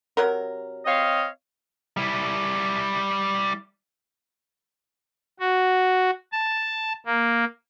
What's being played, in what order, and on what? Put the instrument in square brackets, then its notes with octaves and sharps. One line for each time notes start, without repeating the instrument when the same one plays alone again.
[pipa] C3 F#3 A#4
[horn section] C4 C#5 F5 [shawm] D#5
[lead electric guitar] G3 E4
[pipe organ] F#4
A5
A#3